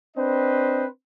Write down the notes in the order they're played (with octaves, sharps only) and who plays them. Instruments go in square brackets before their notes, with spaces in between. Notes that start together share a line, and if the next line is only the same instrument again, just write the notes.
[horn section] C4 D4 B4 C5 D#5